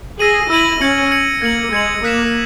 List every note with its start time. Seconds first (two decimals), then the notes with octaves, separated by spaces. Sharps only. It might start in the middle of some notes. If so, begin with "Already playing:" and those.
0.19 G#4 E6 A#6 D#7 F#7
0.50 E4 E6 A#6 D#7 F#7
0.81 C#4 G#6 C#7 F#7
1.11 G#6 C#7 F#7
1.42 A#3 G#6 C#7 F#7
1.72 G#3 G#6 C#7 F#7
2.03 A#3 D#6 F#6 B6 E7